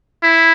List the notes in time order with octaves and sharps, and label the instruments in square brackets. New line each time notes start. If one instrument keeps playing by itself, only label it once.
[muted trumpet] E4